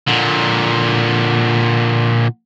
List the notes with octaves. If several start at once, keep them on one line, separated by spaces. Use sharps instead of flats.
A#2 D3